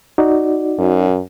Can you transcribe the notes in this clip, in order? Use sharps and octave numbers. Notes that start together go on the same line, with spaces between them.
D#4 F#4 D5
F#2